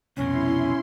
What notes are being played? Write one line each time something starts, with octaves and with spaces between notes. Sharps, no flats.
C2 F2 B2 C#4 E4 C6